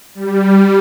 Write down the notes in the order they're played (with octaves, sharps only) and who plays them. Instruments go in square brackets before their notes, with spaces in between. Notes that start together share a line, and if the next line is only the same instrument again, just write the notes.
[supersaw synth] G3